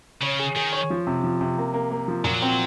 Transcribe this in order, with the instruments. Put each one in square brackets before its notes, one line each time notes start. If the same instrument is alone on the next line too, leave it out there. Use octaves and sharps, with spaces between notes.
[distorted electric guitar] C#3 [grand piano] C#5
[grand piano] G#4
[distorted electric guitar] D#3 [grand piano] G#4
[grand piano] C#5
F3
C3
F3
C3
A#3
A#3
A#3
F3
[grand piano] A#2 [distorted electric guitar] F#3
[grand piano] C4